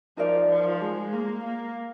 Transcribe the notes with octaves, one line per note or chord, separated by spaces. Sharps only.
F3 D#4 A#4 D5 F5
F3
G#3
A#3
A#3